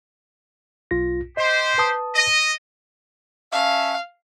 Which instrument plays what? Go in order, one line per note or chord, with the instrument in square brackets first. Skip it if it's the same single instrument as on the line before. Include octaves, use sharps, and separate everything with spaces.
[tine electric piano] B1 F4 A#6
[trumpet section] G4 C5 [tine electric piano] D#5
[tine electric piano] B4 A5 D#6
[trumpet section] D#5
[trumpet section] C#4 E5 A5 [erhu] F5